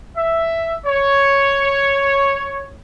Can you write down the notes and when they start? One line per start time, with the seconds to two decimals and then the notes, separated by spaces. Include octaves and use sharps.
0.17 E5
0.87 C#5